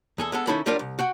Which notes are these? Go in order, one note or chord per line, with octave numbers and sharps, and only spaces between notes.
E2 G#4 A4
G#3 B3 A4
D#3 C#4 D#4 E4 A4 B5
F#3 G3 D4 F4 A#4 D5
C2
F#4 F#5 G5